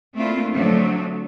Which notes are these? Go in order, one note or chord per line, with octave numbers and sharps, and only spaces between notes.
A3 A#3 C4 D4 E4 F4
D3 F3 F#3 A3 C4